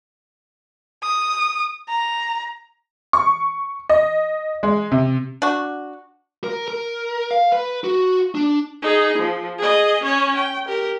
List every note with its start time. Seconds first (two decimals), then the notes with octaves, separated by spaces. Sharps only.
1.03 D#6
1.89 A#5
3.13 C#6
3.89 D#5
4.63 G#3
4.92 C3
5.42 D4 F#4
6.44 A#4
6.68 A#4
7.31 F5
7.52 B4
7.84 F#4
8.35 D4
8.82 D#4 G#4
9.19 F3
9.59 G#4 D#5
10.04 C#4 C#5
10.37 G5
10.68 G4 A#4